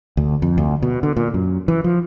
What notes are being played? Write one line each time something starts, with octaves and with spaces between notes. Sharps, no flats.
D2
F2
D2
B2
D3
A#2
F#2
E3
F3